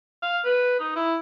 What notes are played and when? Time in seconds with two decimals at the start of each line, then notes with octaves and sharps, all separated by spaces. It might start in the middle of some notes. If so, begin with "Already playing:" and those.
0.23 F5
0.45 B4
0.80 D#4
0.96 E4